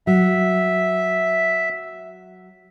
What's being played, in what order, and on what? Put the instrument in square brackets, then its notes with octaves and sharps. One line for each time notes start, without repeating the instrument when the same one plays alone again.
[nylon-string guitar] F#3 [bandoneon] E5